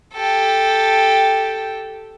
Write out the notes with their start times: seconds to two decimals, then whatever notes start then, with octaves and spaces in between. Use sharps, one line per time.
0.14 G4 A4